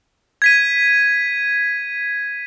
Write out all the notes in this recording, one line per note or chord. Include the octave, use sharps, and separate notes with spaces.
G#6 B6 D#7